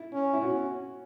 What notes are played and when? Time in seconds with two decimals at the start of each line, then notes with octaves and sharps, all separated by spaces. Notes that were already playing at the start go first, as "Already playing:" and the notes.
Already playing: E4
0.13 C#4
0.33 E4
0.42 C#4 F#4